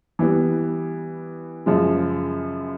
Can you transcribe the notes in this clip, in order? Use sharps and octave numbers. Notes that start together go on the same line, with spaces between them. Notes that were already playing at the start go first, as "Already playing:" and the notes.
E3 G3 B3
F#2 C#3 F3 G#3